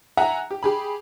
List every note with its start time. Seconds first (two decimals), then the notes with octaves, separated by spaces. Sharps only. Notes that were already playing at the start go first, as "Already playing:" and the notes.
0.17 E5 F#5 G#5 A#5
0.51 G4
0.63 G4 G#4 B5